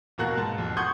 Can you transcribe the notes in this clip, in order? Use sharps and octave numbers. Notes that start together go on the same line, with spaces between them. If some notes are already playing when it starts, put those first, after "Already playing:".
F1 B2 A#3 F#4 A#5 F#6
G#2 A5
F1
F#5 C6 C#6 D#6 G6 G#6